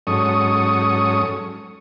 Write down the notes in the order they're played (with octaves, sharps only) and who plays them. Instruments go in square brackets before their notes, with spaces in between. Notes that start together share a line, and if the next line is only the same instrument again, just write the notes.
[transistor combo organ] G#2 F#3 C#4 A4 C#6 D#6